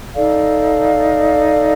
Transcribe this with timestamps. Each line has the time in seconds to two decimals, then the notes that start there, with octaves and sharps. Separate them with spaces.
0.14 D#4 A4 D5 F5